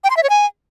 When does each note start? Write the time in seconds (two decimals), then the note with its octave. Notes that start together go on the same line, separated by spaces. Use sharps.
0.04 G5
0.10 C6
0.17 E5
0.23 C#5
0.30 G#5